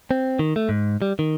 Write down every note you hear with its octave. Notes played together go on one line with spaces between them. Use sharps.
C4
D#3
A3
G#2
G3
D#3